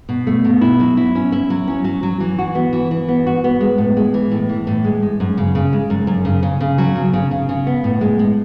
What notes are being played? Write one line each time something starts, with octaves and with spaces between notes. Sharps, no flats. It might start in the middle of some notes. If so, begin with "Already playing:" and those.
B2
A3
B2
E4
F#3
E4
C#4
E4
F#3
C#4
F#3
F#3
E3
F#4
B3
E3
E3
B3
F#4
B3
G#3
A2
G#3
E3
A2
E3
A2
G#3
G#3
F#2
C#3
C#3
G#3
F#2
F#2
C#3
C#3
C#3
F#3
C#3
C#3
C#3
C#3
B3
A2
G#3
G#3